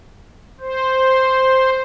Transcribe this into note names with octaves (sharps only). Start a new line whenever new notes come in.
C5